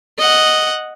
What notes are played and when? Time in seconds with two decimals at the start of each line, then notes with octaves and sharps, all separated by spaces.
0.18 D#5 F#5